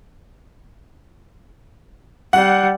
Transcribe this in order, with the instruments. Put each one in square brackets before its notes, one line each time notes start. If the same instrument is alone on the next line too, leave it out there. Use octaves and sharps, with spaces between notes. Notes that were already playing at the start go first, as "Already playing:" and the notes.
[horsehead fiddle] G3 [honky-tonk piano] F#5